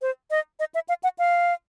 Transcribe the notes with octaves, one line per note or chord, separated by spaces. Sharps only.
C5
D#5
D#5
E5
F5
F#5
F5